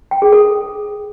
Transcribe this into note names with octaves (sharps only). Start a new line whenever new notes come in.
G5
G#4
A4